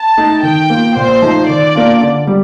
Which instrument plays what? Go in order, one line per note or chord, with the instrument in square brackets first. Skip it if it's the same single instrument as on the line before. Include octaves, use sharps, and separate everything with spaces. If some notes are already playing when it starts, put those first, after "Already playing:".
Already playing: [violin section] A5
[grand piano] A3 D#4
[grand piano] D#3 [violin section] G5
[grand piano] A#3 F4
[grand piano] A#2 [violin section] C5
[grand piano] F3 A3 D#4
[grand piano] D#3 [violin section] D5
[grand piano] A#3 D4 F4
D3
G3